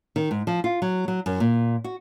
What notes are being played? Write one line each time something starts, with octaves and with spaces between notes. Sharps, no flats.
D#3
G#2
F3
F4
F#3
F#3
F#2
A#2
F#4